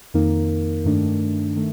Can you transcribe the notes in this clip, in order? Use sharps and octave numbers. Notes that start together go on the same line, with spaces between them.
F2 D#3 A#3 D#4 A#4
G2 D#3 A3 D4
D#3 A3